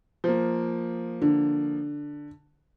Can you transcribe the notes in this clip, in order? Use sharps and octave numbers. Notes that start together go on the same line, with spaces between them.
F3 A#3
D3